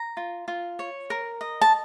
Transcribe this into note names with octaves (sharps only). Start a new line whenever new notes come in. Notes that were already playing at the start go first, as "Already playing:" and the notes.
Already playing: A#5
F4
F4
C#5
A#4
D#5
A5